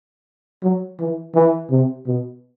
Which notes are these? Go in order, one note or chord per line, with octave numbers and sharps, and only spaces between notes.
F#3
E3
E3
C3
B2